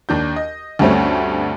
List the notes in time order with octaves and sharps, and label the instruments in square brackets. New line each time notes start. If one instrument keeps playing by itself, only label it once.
[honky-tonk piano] D#2 D4 G6
D#5
D2 G2 G3 A3 C4 C#4